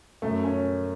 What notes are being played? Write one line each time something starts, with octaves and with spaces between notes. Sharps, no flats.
F#2 A3
C#4